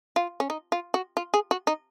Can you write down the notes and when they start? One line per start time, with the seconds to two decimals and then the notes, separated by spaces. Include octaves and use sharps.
0.16 F4
0.40 C#4
0.50 D#4
0.72 F4
0.94 F#4
1.17 F4
1.34 G#4
1.51 F#4
1.67 D#4